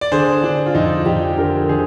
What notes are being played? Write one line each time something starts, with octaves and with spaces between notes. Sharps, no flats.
D5
D3 G#4 C5
D3 D4
F4
F2 D#4
F2 D#4 G4
D3 G4 A#4
D3 G#4 C5